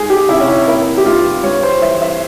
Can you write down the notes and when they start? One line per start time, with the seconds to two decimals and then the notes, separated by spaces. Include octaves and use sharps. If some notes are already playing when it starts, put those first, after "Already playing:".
Already playing: G#2 G#3 G#4
0.10 G4
0.29 C3 E4
0.40 C#4
0.48 E4
0.67 A#3 E4
0.97 G4
1.06 G2 F4
1.44 G2 C#5
1.63 C5
1.81 E3 E5
2.02 E5